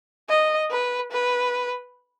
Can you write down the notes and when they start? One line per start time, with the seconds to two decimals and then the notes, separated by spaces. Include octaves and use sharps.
0.29 D#5
0.70 B4
1.11 B4